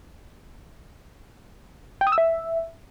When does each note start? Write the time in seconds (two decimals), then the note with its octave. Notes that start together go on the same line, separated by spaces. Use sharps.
2.01 G5
2.07 D#6
2.12 E6
2.18 E5